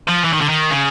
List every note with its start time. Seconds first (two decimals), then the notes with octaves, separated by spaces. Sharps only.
0.09 F3
0.25 E3
0.33 D#3
0.42 D3
0.49 D#3
0.71 C#3